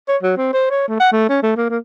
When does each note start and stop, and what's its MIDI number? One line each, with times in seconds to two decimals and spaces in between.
0.08 0.17 73
0.23 0.34 54
0.37 0.50 60
0.53 0.70 72
0.70 0.87 73
0.88 0.98 57
1.00 1.12 78
1.12 1.27 57
1.29 1.41 61
1.43 1.53 57
1.57 1.68 58
1.70 1.78 58